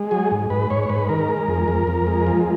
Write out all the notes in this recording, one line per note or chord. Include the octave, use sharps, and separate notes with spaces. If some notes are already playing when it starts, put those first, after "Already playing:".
Already playing: G#3
F#3 G#4
G#2
G#2 B4
G#2 C#5
C#5
G#2 B4
D#3 A#4
G#3
F2
F2
F2
G#3
F3